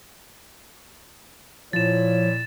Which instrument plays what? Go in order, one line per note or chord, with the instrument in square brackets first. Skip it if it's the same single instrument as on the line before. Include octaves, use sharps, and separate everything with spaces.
[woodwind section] A#2 E4 [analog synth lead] F3 [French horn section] C#5 [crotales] A6 E7